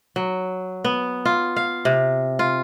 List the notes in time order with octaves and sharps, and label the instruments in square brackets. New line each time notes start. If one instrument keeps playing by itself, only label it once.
[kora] F#3
B3
F4
F5
C3
F4